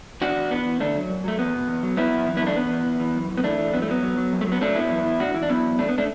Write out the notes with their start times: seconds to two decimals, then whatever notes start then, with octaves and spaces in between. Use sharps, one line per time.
0.21 E2 D4 F#4
0.36 E2
0.50 E3 B3
0.66 E3
0.80 D3 A3 D4
0.95 F#3
1.10 F#2
1.24 F#3 A3
1.38 E2 B3
1.54 B2
1.68 E2
1.83 F#3
1.97 F#2 B3 E4
2.12 F#2
2.26 E3
2.37 F#2 B3 E4
2.46 A3 D4
2.56 E2 B3
2.71 E3
2.86 E2
3.00 E3
3.15 F#2
3.30 E3
3.37 B3
3.44 E3 A3 D4
3.59 E3
3.73 F#3 B3
3.82 A3
3.88 F#3 B3
4.03 F#3
4.18 F#3
4.33 F#2
4.41 A3
4.47 F#3
4.52 B3
4.61 F#3 A3 D4
4.76 F#2 B3 E4
4.90 E3
5.06 E3
5.20 A2 D4 F#4
5.34 E3 E4
5.42 D4
5.49 F#3 B3 E4
5.64 E2
5.79 E2 A3 D4
5.89 B3
5.98 A3 D4